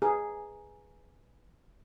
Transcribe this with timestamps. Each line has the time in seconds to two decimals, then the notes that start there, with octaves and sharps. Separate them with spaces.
0.02 G#4 B4 G#5 A#5